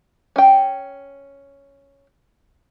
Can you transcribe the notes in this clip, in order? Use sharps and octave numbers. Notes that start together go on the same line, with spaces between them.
C#4 G5